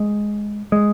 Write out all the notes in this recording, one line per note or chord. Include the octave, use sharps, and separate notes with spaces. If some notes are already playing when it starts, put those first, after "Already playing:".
Already playing: G#3
G#3